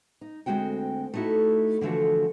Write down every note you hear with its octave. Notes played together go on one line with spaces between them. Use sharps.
D#4
D2 G2 G#3 C4 F#4 G5
A3 B3 D#4 E4 F#4
D3 E3 F3 A3 F#4